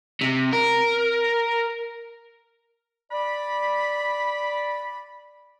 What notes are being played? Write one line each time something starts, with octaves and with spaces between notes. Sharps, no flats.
C3
A#4
D5 B5